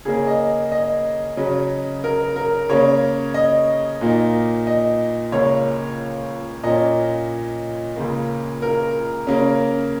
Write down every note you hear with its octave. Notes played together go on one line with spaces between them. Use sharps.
C#3 A#3 C#4 G#4
D#5
D#5
C#3 F#3 C#4
A#4
A#4
C#3 A#3 C#4 C#5
D#5
A#2 A#3 D#4
D#5
C#2 C#3 A#3 C#5
A#2 A#3 C#4 D#5
C#2 C#3 A#3
A#4
C#3 A#3 C#4